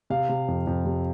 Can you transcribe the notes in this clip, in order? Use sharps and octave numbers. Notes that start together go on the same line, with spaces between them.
C3 F5
C3
F2
F2
C3